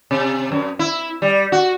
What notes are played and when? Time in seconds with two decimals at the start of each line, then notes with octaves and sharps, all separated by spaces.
0.11 C3
0.52 F#2
0.79 E4
1.22 G3
1.52 F#4